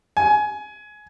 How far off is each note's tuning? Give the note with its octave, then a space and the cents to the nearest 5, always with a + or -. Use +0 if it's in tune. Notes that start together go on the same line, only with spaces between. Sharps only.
G#5 +20